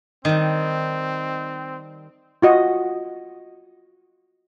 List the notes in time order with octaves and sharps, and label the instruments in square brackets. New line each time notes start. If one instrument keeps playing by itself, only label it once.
[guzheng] D#3 G3 [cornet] C4 [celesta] D#5
[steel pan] F4 F#4 D#5